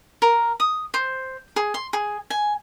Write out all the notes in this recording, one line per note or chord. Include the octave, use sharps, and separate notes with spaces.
A#4
D#6
C5
G#4
C6
G#4
G#5